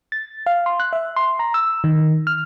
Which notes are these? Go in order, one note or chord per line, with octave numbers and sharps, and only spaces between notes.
A6
F5
C6
F#6
E5
C6
A#5
E6
D#3
F6